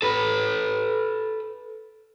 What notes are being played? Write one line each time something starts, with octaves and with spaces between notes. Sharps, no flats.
A4 B4